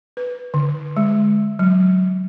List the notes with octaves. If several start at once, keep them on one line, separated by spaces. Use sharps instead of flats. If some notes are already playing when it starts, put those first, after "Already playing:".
B4
D3
G#3
F#3